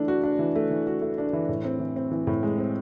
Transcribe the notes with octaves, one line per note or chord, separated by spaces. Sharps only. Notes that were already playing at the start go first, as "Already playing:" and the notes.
Already playing: E3 A3 D4
F#4
D4
E3
A3
E3
F#4
A3
D4
E3
A2
C4
E3
C4
E3
A2
G#3
C4